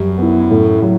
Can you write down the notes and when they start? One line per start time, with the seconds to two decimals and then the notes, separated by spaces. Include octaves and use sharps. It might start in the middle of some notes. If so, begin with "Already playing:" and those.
Already playing: F#2 G3
0.18 B3 E4
0.50 A2
0.82 F#3